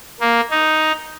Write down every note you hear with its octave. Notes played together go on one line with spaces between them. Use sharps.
A#3
D#4